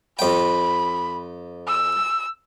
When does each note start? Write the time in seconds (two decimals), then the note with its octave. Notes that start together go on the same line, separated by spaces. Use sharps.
0.19 F2 G5 B5
1.67 E6